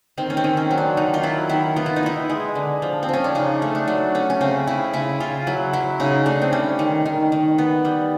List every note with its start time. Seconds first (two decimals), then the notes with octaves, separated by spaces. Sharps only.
0.18 D#3 C4
0.30 C#4
0.37 C4
0.44 D#3
0.57 C#4
0.71 F#3
0.78 D4
0.97 D#3 D#4
1.14 F4
1.23 F#3 E4
1.49 D#3 E4
1.76 B3 F4
1.86 E4
1.96 D#4
2.03 B3 E4
2.30 G#3
2.55 D3
2.82 F3
3.03 C4
3.09 F3 C#4
3.24 D4
3.35 C#3 D#4
3.62 A3
3.75 D4
3.88 F#3
4.15 A3 C#4
4.30 C#4
4.41 C#3 C4
4.67 C#3 E4
4.93 C#3 E4
5.20 C#3 F4
5.47 F#3 E4
5.73 F#3 E4
6.00 C#3 D#4
6.26 A3 D4
6.42 C4
6.52 G3 C#4
6.79 D#3
7.06 D#3
7.32 D#3
7.58 B3
7.85 G3